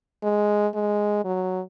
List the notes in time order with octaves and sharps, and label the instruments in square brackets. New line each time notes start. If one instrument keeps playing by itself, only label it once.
[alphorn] G#3
G#3
F#3